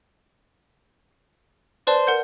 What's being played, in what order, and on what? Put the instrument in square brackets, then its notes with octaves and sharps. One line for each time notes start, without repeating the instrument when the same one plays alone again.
[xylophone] B4 D5 A5 [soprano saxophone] C5
[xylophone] A#4 F#5 G6